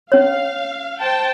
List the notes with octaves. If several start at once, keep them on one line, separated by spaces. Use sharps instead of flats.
C#4 C#5 F5
C5 G5 A5